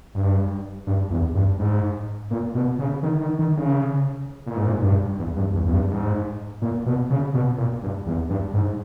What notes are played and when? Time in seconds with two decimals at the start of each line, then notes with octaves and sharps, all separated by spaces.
0.15 G2
0.87 G2
1.10 E2
1.35 G2
1.59 G#2
2.31 A#2
2.55 B2
2.79 C#3
3.03 D#3
3.21 D#3
3.39 D#3
3.57 C#3
4.47 A#2
4.57 G#2
4.67 A#2
4.82 G2
5.19 E2
5.36 G2
5.54 E2
5.66 E2
5.73 G2
5.90 G#2
6.62 A#2
6.86 B2
7.10 C#3
7.34 B2
7.58 A#2
7.83 G2
8.06 E2
8.30 G2
8.54 G#2